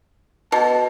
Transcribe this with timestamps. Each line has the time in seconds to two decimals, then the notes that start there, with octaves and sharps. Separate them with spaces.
0.52 B2 A5